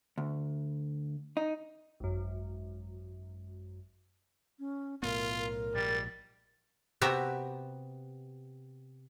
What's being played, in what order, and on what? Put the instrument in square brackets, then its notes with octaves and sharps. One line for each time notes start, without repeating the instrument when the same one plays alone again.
[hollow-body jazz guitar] D2
D#4
[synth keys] G#1 F#2
[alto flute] C#4
[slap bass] B1 A2 B3 [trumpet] F4 [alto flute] A#4
[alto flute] A#4
[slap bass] A#1 G#2 [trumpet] G3 [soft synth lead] A6
[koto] C3 B3 F#4 G4 E5 A#5